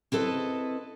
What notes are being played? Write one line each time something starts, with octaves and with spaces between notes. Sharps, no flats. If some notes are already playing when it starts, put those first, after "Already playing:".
C4 E4 A4 B4 D#5